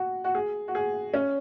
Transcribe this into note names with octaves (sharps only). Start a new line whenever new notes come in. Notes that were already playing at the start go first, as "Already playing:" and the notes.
Already playing: F#4
F#4
G#4
F#4
G#4
C#4